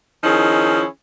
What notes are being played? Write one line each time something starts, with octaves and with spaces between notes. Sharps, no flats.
D#3 F3 C#4 D#4 E4 G#4